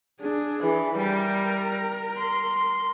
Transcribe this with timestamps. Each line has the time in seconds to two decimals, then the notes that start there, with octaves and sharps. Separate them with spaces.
0.21 D4 G#4
0.61 E3
0.97 G3 A#4
2.18 C6